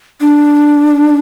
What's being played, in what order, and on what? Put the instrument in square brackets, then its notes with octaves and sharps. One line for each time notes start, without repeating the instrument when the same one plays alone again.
[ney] D4